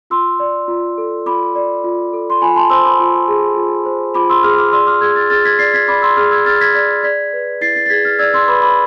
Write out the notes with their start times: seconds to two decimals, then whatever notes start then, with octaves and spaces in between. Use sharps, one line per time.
0.10 F4 C6 E6
0.40 D5
0.68 F4
0.98 A4
1.26 F4 B5 D6
1.55 D5
1.84 F4
2.13 A4
2.30 C6
2.42 F4 G#5 B5
2.56 A5 C6
2.70 C5 C6 E6
2.85 B5 D6
3.00 F4
3.28 G#4
3.57 F4
3.86 C5
4.14 F4 B5 D6
4.30 C6 E6
4.43 G#4 D6 F6
4.58 D6 F6
4.72 D5 C6 E6
4.87 D6 F6
5.01 G#4 E6 G#6
5.16 F6 A6
5.30 G#4 F6 A6
5.45 G#6 B6
5.59 D5 A6 C7
5.74 G#6 B6
5.88 D5 B5 D6
6.02 C6 E6
6.17 G#4 D6 F6
6.31 E6 G#6
6.46 G#4 F6 A6
6.61 G#6 B6
6.74 D5 G#6 B6
7.03 D5 G#6 B6
7.33 B4
7.61 E4 A6 C7
7.75 A6 C7
7.86 A6
7.90 G#4 G#6 B6
8.05 F6 A6
8.19 D5 E6 G#6
8.33 C6 E6
8.48 B4 B5 D6
8.62 B5 D6